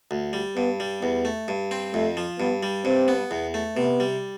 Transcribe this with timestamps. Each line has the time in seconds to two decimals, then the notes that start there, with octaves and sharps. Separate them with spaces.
0.11 D2
0.33 G3
0.57 G2 B3
0.80 G3
1.02 E2 B3
1.25 A3
1.48 G2
1.71 C4
1.94 F2 A3
2.17 F3
2.40 G2 B3
2.63 G3
2.85 G2 C4
3.08 B3
3.31 E2
3.54 A3
3.77 C3 B3
4.00 G3